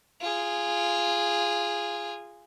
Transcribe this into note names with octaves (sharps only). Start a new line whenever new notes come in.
F4 G#4